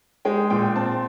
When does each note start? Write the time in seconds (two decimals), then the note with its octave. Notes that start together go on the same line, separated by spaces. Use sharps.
0.25 G#3 G5
0.50 A#2 G5
0.76 C4 A5